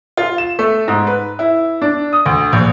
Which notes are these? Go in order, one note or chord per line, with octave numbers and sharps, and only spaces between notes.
F4
E7
A3
G#2
B4
E4
D4
D#6
D2
A#1